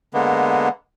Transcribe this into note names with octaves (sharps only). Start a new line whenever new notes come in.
D3 G#3 A#3 B3